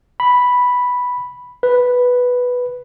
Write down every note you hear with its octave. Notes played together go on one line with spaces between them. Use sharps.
B5
B4